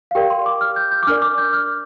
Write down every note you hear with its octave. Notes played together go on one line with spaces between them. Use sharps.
F5
G4 A#4 D5 G5
C6
D6
F6
G6
G6
D6
D4 A#4 D5 F6
D6
G6
F6